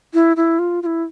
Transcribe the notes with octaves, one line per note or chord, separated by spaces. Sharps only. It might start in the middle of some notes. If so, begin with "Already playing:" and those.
E4
E4
F4
F4
E4